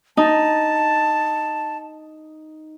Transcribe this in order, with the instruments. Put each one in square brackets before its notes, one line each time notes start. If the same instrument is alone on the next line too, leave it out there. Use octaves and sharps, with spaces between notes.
[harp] D#4 [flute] A5